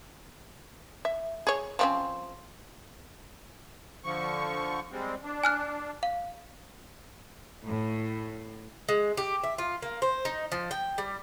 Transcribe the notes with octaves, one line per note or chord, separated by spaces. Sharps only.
E5
G#4 C#5
F3 C4 C#4
D3 F3 C#6
G3 G#3 C4
D4
G#5 F6 F#6
F5
A2
G#3
G4
E5
F4
A#3
C5
D#4
F3
G5
G3